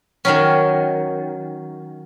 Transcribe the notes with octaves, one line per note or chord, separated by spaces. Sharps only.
D#3 F#3 C#4